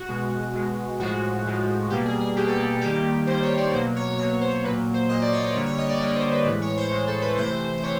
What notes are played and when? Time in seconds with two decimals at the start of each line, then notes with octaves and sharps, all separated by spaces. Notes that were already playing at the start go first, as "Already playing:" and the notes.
Already playing: F#4
0.09 B2 G#3
0.54 B2 G#3
0.99 A2 F3 G#3 F#4
1.45 A2 F3 G#3
1.90 B2 G3 A#3 G4
2.05 G#4
2.20 G#4
2.36 B2 G3 A#3 G4
2.47 A4
2.59 G#4
2.81 D#3 G3 A#3 G4
3.27 D#3 G3 A#3 C5
3.42 C#5
3.57 D5
3.73 B2 F#3 A#3 C5
3.96 C#5
4.18 B2 F#3 A#3 C#5
4.41 C5
4.64 A#2 F#3 A#3 B4
4.94 C5
5.09 A#2 F#3 A#3 D#5
5.22 D5
5.32 C#5
5.44 C#5
5.55 D3 G3 A#3 C#5
5.66 C#5
5.78 D#5
5.89 D5
6.00 D3 G3 A#3 C#5
6.16 C5
6.31 B4
6.46 A2 E3 G#3 B4
6.62 C#5
6.77 C5
6.91 A2 E3 G#3
7.07 A4
7.22 B4
7.37 C3 E3 A3 C5
7.77 C5
7.83 C3 E3 C#5